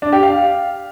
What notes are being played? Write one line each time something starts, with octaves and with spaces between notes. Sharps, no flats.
D4
G4
F5